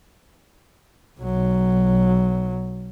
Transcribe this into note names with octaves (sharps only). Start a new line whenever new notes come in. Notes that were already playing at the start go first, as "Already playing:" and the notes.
B1 F#3